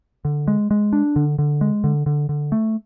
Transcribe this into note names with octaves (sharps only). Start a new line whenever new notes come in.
D3
G#3
G#3
D4
D3
D3
G#3
D3
D3
D3
A3